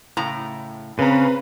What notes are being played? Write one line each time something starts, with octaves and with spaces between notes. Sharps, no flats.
A2 C#3 A#5
C#3 C4 B4 A#5